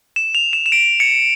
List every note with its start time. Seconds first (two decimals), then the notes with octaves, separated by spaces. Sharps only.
0.16 E7
0.35 F7
0.53 E7
0.66 E7
0.72 D7
1.00 C#7